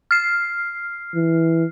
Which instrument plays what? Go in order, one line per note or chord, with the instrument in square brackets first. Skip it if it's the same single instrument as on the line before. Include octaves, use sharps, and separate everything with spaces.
[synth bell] F6 C7
[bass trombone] E3